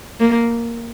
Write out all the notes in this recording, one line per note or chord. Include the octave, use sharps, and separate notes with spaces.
A#3